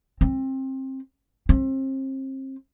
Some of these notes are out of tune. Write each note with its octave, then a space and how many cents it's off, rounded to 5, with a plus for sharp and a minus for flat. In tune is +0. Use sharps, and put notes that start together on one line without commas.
C4 +25
C4 +35